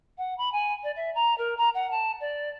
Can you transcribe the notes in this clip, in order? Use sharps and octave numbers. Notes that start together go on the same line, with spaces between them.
F#5
B5
G#5
D5
E5
A#5
A#4
A#5
F#5
A5
D5